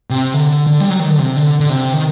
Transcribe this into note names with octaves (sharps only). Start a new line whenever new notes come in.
C3
D3
D3
G3
F#3
D#3
D3
C3
D3
D3
C3
D#3